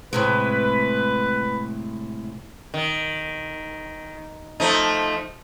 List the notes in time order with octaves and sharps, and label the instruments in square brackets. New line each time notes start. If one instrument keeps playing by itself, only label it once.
[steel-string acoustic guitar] A2 C3 G#3 [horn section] B4
[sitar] D#3
F3 A3 D#4